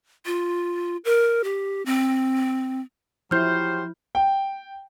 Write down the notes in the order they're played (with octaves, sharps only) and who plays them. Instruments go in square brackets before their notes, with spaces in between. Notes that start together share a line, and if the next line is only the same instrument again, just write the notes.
[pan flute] F4
A#4
G4
C4
[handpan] F3 E4 [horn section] F#3 G4 C5 [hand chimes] F6 G6
[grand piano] G5